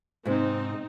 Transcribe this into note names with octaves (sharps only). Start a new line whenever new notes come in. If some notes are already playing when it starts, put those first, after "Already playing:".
G#2 C3 C4 D#4